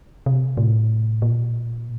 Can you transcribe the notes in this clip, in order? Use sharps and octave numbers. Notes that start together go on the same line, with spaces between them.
C3
A2
A#2